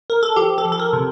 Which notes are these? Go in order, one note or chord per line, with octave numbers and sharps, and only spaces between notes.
A#4
A4
F3 G4
A4
F3
A4
A#4
C3